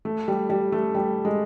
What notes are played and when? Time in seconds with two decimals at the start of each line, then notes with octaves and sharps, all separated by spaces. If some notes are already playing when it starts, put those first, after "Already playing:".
0.05 A3
0.28 G3
0.49 G3
0.72 A3
0.95 G3
1.25 G#3